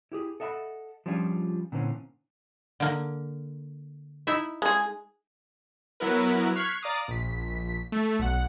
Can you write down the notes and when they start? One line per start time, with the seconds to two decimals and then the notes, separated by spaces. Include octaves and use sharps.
0.12 E4 G4 G#4
0.40 A4 D#5 E5 F#5 A#5 B5
1.06 F3 G3 C#4 D4 F4 G#4
1.72 A#2 D3 E3 C4 C#4
2.80 D3 A#3
4.27 D#4 E4 E5
4.62 G#3 G#4
6.00 F#3 B3 E4 A#4 B4
6.56 C#6 F6 F#6 G#6 B6 C7
6.82 D5 F5 A#5 D6 D#6 C7
7.08 A#1 B6
7.92 A3
8.19 B1 F#5